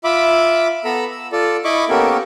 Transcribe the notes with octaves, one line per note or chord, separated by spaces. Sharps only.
F4 E5 B5 D6
B3 A4 A#5 B5 E6
E6
F4 A4 D5
E4 D#5 B5 C#6 D6
A#3 B3 C#4 G4 A4 A#4